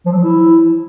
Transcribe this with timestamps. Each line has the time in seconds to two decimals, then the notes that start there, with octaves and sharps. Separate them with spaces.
0.06 F3
0.12 F#3
0.18 F3
0.23 E4